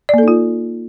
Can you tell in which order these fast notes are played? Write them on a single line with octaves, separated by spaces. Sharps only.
D5 A#3 A4 D#4 F4